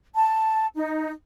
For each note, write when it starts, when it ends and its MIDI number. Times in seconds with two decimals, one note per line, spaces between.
0.14 0.66 81
0.74 1.11 63